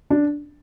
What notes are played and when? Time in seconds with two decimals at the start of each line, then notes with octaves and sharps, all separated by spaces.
0.10 D4